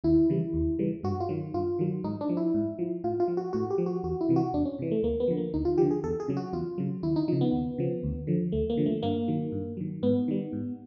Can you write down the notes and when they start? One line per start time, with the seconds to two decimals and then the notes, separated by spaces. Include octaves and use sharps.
0.04 D#2 E4
0.30 C#3 E3 G3
0.53 D#2
0.79 C#3 E3 G3
1.03 G2 F#4
1.20 F4
1.29 D#3 F#3
1.54 G2 F4
1.79 D#3 F#3
2.04 G#2 D#4
2.21 D4
2.29 F3
2.37 E4
2.54 G#2
2.79 F3
3.04 A2 F4
3.20 F4
3.28 F3
3.37 F#4
3.53 A2 F#4
3.70 G4
3.78 F3
3.86 F#4
4.03 E2 F#4
4.21 E4
4.29 C3 E3
4.36 F#4
4.54 E2 D4
4.65 C#4
4.79 C3 E3
4.91 A3
5.03 D2 A#3
5.20 B3
5.28 D3 F3
5.37 A#3
5.54 D2 D#4
5.65 F4
5.78 D3 F3 G4
5.91 G#4
6.04 E2 A4
6.20 G#4
6.28 C#3 F#3
6.37 F#4
6.53 E2 F4
6.78 C#3 F#3
7.03 D#2 E4
7.16 D#4
7.28 C#3 F3 D#4
7.41 B3
7.52 D#2
7.78 C#3 F3
8.03 D2
8.27 D3 F3
8.52 D2 A3
8.70 A#3
8.77 D3 F3
8.86 A3
9.03 G2 A#3
9.28 D#3 F#3
9.52 G2
9.77 D#3 F#3
10.03 G#2 B3
10.28 D#3 G3
10.53 G#2